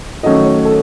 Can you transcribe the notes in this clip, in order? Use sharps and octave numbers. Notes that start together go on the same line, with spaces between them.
D#3 F#3 A3 C#4 D#5
C#5
A4